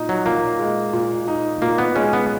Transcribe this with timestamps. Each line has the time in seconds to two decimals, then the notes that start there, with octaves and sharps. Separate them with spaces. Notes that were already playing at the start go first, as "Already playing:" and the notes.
Already playing: A#2 D#4
0.09 F#3
0.26 A#2 A#3
0.59 G#3
0.93 A#2
1.28 D#4
1.62 A#2 A#3
1.78 B3
1.95 G#3 C#4
2.13 B3